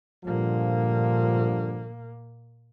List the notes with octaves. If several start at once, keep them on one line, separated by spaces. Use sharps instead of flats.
G2 A#2 D3 F3 A#3